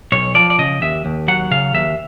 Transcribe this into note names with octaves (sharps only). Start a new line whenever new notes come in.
B1 C#5
F3 D5
D5
C#3 D#5
D#2 E5
D#2
F#3 F#5
C#3 F5
D#2 E5